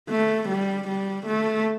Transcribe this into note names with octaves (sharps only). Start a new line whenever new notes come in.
A3
G3
G3
A3